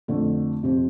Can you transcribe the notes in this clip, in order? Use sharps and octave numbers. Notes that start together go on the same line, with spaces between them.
F2 D3 A3
F2 C3 F3 C4